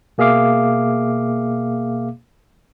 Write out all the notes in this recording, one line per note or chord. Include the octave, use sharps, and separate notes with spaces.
B2 A#3 G#4 E5 F5 D6